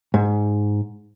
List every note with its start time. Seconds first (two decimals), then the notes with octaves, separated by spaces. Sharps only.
0.14 G#2